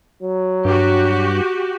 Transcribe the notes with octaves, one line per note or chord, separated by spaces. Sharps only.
F#3
G2 F#4 G4